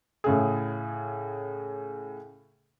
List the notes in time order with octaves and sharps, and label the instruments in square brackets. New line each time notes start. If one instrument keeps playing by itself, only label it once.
[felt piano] A2 C#3 G#4